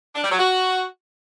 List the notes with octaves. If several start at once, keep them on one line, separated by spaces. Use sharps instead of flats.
D4
G3
F#3
F#4